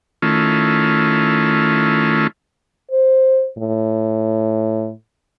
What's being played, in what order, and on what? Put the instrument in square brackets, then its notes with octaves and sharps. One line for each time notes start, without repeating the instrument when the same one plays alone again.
[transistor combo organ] D#3 A3 C#4 E4 F4
[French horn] C5
A2